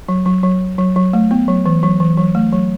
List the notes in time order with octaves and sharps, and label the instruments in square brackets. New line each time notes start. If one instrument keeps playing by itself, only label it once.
[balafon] F#3
F#3
F#3
F#3
F#3
A3
B3
F#3
E3
F#3
E3
F#3
A3
F#3